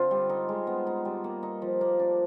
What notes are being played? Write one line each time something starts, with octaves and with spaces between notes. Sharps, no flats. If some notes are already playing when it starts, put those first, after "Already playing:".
Already playing: D3 C4 F4
G3
D#4
G#3
B3
D#4
G3
A#3
D#4
F3
A#3
D4